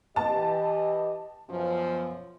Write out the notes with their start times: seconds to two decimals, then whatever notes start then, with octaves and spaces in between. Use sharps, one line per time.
0.16 E3 G4 D#5 A5
1.50 F#2 B2 F3